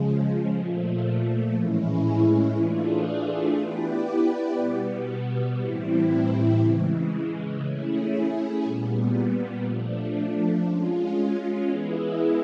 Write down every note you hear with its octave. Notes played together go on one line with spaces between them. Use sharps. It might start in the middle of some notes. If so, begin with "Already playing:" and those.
Already playing: C#3 F3 G#3
A#2 F3 A3
A2 E3 G#3 C#4 E4
E3 A3 D4 F4 G#4
B3 E4 G4 B4 D5
B2 G3 B3
A2 E3 G3 C4 E4
C#3 E3 G#3
A3 C#4 E4 G#4
A#2 G3 B3
F3 A3 D4
G#3 C#4 F4
E3 G#3 B3 E4 G#4